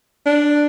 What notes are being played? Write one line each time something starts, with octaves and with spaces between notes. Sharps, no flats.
D4